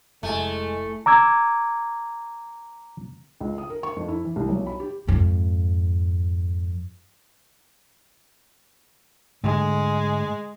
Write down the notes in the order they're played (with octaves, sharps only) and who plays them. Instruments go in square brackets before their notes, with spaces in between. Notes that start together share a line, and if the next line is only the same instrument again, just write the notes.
[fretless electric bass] F1 [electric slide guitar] A2 E5 G#5 [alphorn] G#3 [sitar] A3
[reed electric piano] A#5 D6 E6 G#6
[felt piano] C#2
D#6
A#4
C#6
F2
E4
E3
C2
B1
B5
G4
[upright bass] F2 G#2
[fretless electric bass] G#2 D3 A3 [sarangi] G#3